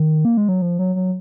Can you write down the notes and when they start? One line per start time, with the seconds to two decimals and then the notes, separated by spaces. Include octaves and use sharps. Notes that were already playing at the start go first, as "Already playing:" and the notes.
Already playing: D#3
0.25 A#3
0.37 G#3
0.49 F#3
0.62 F3
0.79 F#3
0.95 F#3